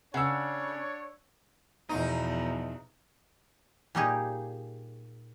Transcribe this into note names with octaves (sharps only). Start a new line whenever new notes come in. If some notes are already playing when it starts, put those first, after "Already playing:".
C#3 D4 C#5 F#5 E6
E2 B2 F3 D#4
A#2 G3 A#3 D#4 G4 G#4